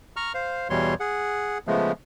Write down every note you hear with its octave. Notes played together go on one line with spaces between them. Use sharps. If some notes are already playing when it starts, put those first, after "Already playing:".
A#5 C#6 F6
C5 F5
E2 B2 E3 G3 C#5 C6
G#4 F#5
C#3 F3 G#3 A3 B3